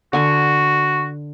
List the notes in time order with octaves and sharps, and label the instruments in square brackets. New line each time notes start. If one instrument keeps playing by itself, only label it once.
[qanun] D3 G#5 C#6 [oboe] F#4